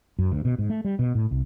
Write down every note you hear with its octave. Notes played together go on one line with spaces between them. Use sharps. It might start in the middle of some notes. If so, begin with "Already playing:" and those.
F#2
D2
B2
G#2
A3
G3
B2
A2
C2